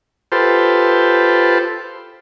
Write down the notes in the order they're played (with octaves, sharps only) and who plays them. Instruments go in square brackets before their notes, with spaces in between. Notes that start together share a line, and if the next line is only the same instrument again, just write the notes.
[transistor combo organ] F4 G4 A4 B4 C5